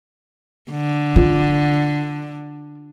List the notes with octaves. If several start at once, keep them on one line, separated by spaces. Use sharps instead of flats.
D3
F4